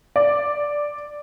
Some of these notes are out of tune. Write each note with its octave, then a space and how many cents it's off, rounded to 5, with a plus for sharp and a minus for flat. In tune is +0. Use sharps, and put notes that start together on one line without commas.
D5 +0